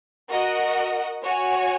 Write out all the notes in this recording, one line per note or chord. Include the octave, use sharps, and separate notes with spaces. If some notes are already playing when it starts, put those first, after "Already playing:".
F#4 A#4 D#5 F#5
F#4 C#5 G#5